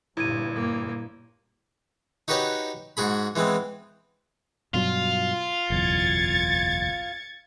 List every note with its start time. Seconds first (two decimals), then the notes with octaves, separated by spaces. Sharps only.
0.17 G1 G2 A#2 E4 G#6 D#7
0.55 A#3
2.28 D#4 F#4 G4 B4 C#5 D#5
2.97 G#2 F#4 G#4 B5
3.36 E3 G#3 B3 C4
4.74 G2 B2 F#3 F4
5.70 F#1 B1 E2 G#6 A6 C#7